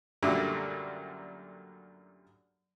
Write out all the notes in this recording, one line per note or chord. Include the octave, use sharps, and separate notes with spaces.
F#2 A#2 D3 F#3 G3 A3